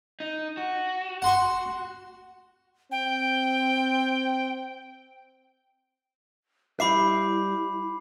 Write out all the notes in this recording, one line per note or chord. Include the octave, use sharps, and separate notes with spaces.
D#4
F#4
F#5 C6 C#6
C4 G5
G3 E4 E5 B5 D6 C7